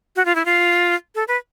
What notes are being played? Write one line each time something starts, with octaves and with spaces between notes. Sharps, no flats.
F#4
F4
E4
F4
A4
B4